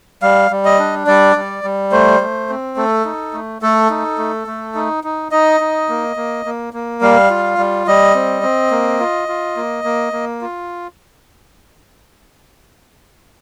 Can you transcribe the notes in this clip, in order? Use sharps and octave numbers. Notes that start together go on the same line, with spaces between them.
G3 F5
G3
D#5
D4
G3 D5
G3
G3
A3 C5
A3
C4
A3 A4
D#4
A3
A3 A4
D#4
A3
A3
D#4
D#4
D#4 D#5
D#4
A#3
A#3
A#3
A#3
G3 F5
F4
G3
G3 D#5
C4
C4
A#3
F4
F4
A#3
A#3
A#3
F4